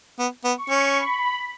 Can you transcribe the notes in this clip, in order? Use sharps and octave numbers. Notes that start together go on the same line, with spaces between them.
B3
B3
C#6
C#4
B5